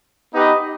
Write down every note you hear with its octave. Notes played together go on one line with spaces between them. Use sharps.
B3 D#4 G4 B4 D#5